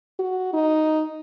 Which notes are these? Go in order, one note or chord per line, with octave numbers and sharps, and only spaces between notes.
F#4
D#4